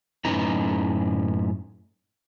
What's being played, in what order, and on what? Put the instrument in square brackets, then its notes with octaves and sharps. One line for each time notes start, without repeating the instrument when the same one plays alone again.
[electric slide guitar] F#2 A2 C#4 D#4 B4 A#5